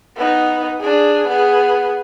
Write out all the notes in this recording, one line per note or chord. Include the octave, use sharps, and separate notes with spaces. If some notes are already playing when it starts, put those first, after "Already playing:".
B3 D#4
D4 G#4
B3 G#4